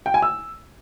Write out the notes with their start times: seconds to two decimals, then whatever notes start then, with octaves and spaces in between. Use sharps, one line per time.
0.06 G5
0.14 G#5
0.22 E6